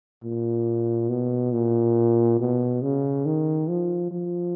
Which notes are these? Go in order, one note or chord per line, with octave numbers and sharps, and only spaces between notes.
A#2
B2
A#2
B2
C#3
D#3
F3
F3